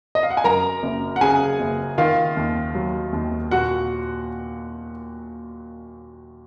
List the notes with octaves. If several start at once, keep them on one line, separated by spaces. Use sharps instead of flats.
D#5
F5
F#5
G#5
F#2 A#4 A#5
F#1
F#5
C#3 G#4 G#5
F#1
D#3 F4 F5
D#2
F#3
D#2
A#2 F#4 F#5